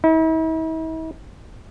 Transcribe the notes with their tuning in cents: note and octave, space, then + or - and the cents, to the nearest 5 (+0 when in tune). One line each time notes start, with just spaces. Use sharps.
E4 -45